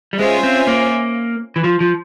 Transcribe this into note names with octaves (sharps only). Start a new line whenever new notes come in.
G3
G#3 C#4 F4 C5 E5 G#5
C4
A#3
E3
F3
F3